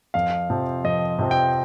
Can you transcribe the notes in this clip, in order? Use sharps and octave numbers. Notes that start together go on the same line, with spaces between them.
F2 F5
C3 F3 C4
F2 D#5
C3 F3 C4
G5